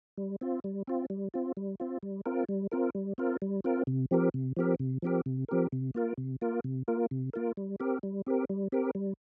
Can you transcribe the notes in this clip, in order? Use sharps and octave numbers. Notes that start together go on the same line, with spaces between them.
G3
C4 F4
G3
C4 F4
G3
C4 F4
G3
C4 F4
G3
C4 F4 A#4
G3
C4 F4 A#4
G3
C4 F4 A#4
G3
C4 F4 A#4
C3
F3 C4 G4 A#4
C3
F3 C4 G4 A#4
C3
F3 C4 G4 A#4
C3
F3 C4 G4 A#4
C3
A#3 F4 A#4
C3
A#3 F4 A#4
C3
A#3 F4 A#4
C3
A#3 F4 A#4
G3
C4 G4 A#4
G3
C4 G4 A#4
G3
C4 G4 A#4
G3